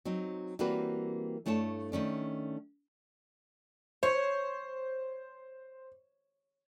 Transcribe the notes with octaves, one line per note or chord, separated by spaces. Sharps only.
F#3 C4 D#4
E3 G3 A#3 C4 F#4 B4
G2 A3 E4 C#5 A5
D#3 A3 C#4 D4
C5 C#5